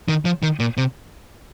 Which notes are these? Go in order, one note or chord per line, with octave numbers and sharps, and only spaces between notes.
D#3
F3
D#3
A#2
C3